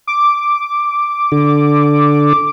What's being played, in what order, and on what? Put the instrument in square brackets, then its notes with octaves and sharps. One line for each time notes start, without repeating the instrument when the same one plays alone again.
[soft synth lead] D6
[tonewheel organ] D3